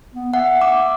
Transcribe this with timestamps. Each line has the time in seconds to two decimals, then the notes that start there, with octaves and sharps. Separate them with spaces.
0.15 B3
0.34 E5 F#5
0.61 D6